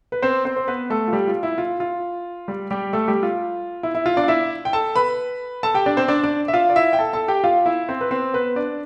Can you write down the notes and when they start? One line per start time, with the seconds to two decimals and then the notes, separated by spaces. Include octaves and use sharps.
0.12 B4
0.22 C4 C5
0.45 C4 C5
0.56 C5
0.68 B3 B4
0.90 A3 A4
1.08 F4
1.13 G3 G4
1.28 F4
1.43 E4
1.58 F4
1.80 F4
2.48 G3 G4
2.71 G3 G4
2.93 A3 A4
3.08 G3 G4
3.23 F4
3.83 E4
3.95 E4
4.06 F4
4.17 D4 D5
4.24 F5
4.28 E4 E5
4.65 G5
4.73 A4 A5
4.96 B4 B5
5.63 A4 A5
5.74 G4 G5
5.86 D4 D5
5.97 C4 C5
6.08 D4 D5
6.23 D4 D5
6.48 E5
6.53 F4 F5
6.70 D5
6.76 E4 E5
6.93 G5
6.99 A4 A5
7.13 A4 A5
7.28 G4 G5
7.44 F4 F5
7.66 E4 E5
7.89 C4 C5
8.01 B4
8.11 C4 C5
8.33 B3 B4
8.56 D4 D5